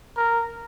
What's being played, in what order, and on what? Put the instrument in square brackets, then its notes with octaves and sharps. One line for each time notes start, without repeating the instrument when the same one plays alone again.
[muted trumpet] A#4